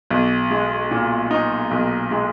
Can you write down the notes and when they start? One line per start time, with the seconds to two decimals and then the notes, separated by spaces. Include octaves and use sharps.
0.11 B1
0.51 G#3
0.91 A#2
1.31 D#4
1.71 B1
2.11 G#3